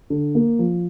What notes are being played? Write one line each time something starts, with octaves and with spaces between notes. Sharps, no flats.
D3
A#3
F3